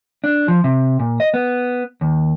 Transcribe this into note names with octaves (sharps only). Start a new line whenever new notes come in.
D4
F3
C3
A#2
D#5
B3
D#2